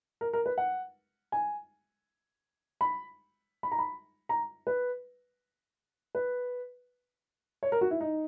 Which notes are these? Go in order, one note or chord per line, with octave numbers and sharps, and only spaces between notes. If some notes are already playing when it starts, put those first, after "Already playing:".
A#4
A#4
B4
F#5
G#5
B5
B5
A#5
B5
A#5
B4
B4
C#5
A#4
F#4
E4
D#4